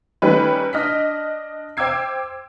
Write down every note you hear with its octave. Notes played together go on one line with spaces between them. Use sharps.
D#3 G3 A3 C#4 D#4 B4
D4 D#5 F6 B6
C5 G5 D6 E6 G#6 C7